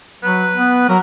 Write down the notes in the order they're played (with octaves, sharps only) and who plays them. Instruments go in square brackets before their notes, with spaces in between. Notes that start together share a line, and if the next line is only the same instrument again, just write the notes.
[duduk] F#3 [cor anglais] B4
[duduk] B3
[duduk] F#3 [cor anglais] A#4